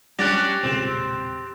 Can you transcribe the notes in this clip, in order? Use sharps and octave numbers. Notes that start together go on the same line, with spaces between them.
G3 C#4 D4 G4 F#6 A6 A#6
E1 A#2 C#3 C4